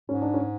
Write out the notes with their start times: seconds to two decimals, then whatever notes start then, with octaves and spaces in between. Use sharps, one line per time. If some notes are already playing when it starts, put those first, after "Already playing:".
0.09 G#2 C#4
0.22 D4
0.34 C#4